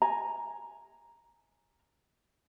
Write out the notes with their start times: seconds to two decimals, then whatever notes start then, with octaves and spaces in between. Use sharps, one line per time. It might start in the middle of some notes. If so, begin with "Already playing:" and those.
0.02 G#5 A#5